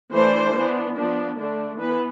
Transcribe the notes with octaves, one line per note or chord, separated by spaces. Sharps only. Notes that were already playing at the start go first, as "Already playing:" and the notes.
E3 A3 D4 C5
E3 B3 D4
F3 B3 D4
D3 A3 D4
E3 B3 B4